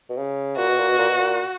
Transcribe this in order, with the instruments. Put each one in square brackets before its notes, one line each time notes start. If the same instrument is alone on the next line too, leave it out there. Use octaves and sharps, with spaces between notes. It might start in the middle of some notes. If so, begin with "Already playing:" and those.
[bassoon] B2
C#3
[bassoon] A#2 [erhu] F#4
[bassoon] B2
A#2
B2
A#2
B2
A#2